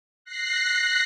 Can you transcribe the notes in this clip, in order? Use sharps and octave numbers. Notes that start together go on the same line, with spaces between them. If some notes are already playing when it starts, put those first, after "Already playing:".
F#6 A#6 C7